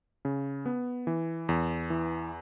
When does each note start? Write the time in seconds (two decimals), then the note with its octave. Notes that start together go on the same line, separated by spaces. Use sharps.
0.25 C#3
0.66 B3
1.07 E3
1.49 E2
1.90 E3